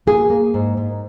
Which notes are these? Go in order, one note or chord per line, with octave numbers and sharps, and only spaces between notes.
A#3 G#4
A#3
G#2
G#2